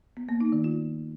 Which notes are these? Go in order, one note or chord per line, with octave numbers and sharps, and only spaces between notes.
B3
A#3
D#4
D#3
F4